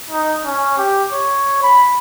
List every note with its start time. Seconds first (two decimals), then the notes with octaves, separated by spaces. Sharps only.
0.10 D#4
0.45 C#4
0.78 G4
1.13 C#5
1.63 B5